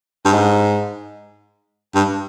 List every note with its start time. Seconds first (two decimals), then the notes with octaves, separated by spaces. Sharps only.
0.25 G2
0.33 G#2
1.95 G2